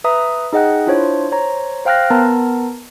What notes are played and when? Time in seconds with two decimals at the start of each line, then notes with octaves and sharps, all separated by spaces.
0.04 B4 E5 A#5 D#6
0.53 D#4 G#4 D#5 F#5 G5 F#6
0.87 D4 E4 F4 C5 C#5
1.31 C5 C#5 A#5
1.85 C5 F5 G5 F6 F#6 A#6
2.10 B3 A#4 A5 A#5